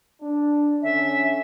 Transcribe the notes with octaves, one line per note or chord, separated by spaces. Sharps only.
D4
D3 C#4 E5